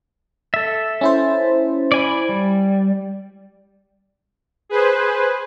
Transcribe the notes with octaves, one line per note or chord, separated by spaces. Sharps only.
A4 E5
C#4 E4 C5
D5 G#5 B5
G3
G#4 B4 C5